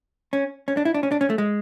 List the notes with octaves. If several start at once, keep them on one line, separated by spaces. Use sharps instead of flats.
C#4
C#4
D4
E4
D4
C#4
D4
C#4
A3
G#3